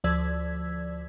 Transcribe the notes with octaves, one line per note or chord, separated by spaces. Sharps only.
D2 F3 D5 E6 G#6 B6